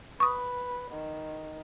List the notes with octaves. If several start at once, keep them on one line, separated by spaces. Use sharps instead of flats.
B4 C#6 D#6
D#3